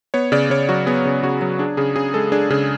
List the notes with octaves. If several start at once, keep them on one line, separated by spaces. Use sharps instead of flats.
B3 C#5
C#3 D5
C#3 C#5
F#3 F#4
B3 G#4
C#3
C#3 F#4
F#3
D4 G#4
C#3 G#4
C#3 G#4
G#3 A4
D4 G#4
C#3 G#4